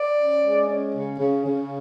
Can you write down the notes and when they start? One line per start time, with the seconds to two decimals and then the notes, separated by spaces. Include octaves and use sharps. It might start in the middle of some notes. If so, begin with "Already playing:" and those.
Already playing: D5
0.17 C#4
0.42 G#3
0.69 C#4
0.94 C#3
1.19 C#3
1.45 C#3